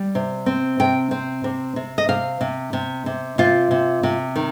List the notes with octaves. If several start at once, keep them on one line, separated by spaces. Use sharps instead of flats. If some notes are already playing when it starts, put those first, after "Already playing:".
Already playing: G3
C3
C4
C3 G5
C4
C3
C3
D#5
C3 F5
C3
C3
C3
C3 F4
C3
C3
D#3